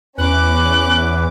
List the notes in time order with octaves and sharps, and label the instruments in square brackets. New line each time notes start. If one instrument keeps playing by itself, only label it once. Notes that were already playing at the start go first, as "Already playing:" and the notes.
[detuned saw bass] E2 [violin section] C#4 D6 [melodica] B4 [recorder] F#6